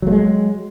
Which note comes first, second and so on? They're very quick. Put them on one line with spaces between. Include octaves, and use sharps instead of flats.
F#3 A3 G#3